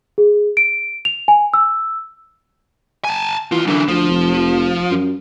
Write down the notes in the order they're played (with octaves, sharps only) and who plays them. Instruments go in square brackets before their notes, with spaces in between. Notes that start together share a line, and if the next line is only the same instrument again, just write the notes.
[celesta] G#4
D7
F7
G#5
E6
[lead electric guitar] G#5 A5
[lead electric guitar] D#2 F4 [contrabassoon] E3
[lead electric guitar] F#2 E3 [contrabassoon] D3
[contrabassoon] D2 [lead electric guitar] F3
[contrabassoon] F1
F#2